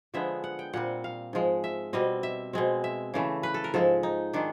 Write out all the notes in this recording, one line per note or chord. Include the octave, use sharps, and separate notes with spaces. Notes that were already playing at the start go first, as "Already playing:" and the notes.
D3 F3 G#3 B3 E5
F#5
G5
A#2 G3 C4 F#5
F5
G#2 F3 G#3
E5
B2 G3 C4 D#5
E5
B2 G#3 C4
E5
C#3 E3 A3
B4
A4
A#4
G#2 F3 G#3 A4
D#4
D#3 G#3 D4